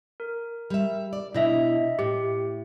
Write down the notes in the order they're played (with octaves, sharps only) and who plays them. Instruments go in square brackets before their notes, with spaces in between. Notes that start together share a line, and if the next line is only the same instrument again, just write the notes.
[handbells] A#4
[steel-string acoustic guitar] G3 E5
D5
[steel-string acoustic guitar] B2 E4 [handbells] D4 D#5 E5
[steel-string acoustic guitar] A2 [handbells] G4